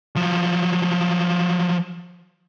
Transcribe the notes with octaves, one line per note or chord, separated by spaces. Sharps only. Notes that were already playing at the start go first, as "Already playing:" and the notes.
F3 F#3